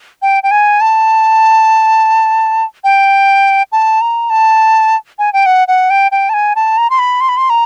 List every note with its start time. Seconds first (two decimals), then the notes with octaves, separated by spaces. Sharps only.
0.22 G5
0.43 G5
0.51 G#5
0.81 A5
2.84 G5
3.72 A5
4.01 A#5
4.30 A5
5.19 G#5
5.33 G5
5.46 F#5
5.68 F#5
5.90 G5
6.12 G5
6.29 A5
6.34 G#5
6.56 A5
6.78 A#5
6.90 C6
6.99 B5
7.21 C6
7.29 B5
7.37 C6
7.50 A#5